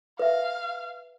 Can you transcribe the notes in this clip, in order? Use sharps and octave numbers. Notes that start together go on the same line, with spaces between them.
B4 E5 F5